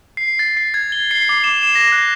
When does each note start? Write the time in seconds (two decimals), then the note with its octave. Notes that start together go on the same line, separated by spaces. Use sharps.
0.17 C7
0.39 A6
0.57 C7
0.74 G#6
0.92 G7
1.11 C7
1.29 D6
1.44 E7
1.63 E7
1.75 A#6
1.92 F#6